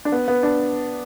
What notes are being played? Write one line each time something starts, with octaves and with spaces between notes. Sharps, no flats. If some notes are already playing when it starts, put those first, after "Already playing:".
D4
B3
B3
D4